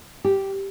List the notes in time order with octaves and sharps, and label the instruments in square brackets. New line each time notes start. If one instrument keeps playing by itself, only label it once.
[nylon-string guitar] G4